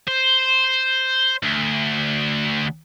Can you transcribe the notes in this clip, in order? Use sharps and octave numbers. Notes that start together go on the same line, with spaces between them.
C5
D2